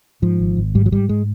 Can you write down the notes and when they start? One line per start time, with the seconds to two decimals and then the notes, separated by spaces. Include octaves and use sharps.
0.22 G#2 F3
0.39 G#1
0.57 G#1
0.75 G#2 G3
0.86 F#3
0.92 G#2 G3
1.09 G#3